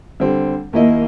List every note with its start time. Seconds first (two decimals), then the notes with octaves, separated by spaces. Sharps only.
0.20 D3 G3 C4
0.73 D#2 A#3 E4 D#5